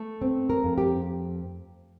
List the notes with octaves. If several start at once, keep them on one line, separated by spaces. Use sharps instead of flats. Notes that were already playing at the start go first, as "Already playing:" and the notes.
Already playing: A3
C4
A#4
F2
G4